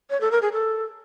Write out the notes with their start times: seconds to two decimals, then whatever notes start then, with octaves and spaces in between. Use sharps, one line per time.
0.10 C#5
0.21 A4
0.31 A#4
0.42 G#4
0.53 A4